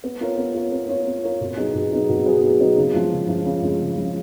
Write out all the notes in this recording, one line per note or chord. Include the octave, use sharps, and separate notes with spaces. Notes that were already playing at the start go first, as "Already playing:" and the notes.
B3
F4 A#4 C#5
B3
F4 A#4 C#5
B3
F4 A#4 C#5
B3
F4 A#4 C#5
B2
F#3 B3 D#4 G#4
B2
F#3 B3 D#4 G#4
B2
F#3 B3 D#4 G#4
B2
F#3 B3 D#4 G#4
C#3
F3 G#3
C#3
F3 G#3
C#3
F3 G#3
C#3
F3 G#3